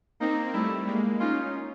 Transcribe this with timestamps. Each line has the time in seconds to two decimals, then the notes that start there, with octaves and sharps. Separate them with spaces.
0.20 A#3 C4 D#4
0.54 G3 A3 E4
0.87 G#3 A#3
1.20 C#4 D#4 F4